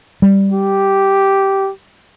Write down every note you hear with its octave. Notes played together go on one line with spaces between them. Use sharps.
G3
G4